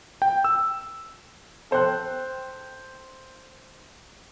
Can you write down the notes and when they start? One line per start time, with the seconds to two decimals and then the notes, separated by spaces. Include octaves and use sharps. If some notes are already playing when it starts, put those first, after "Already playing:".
0.22 G5
0.44 E6
1.71 A4 C5 G5 F#6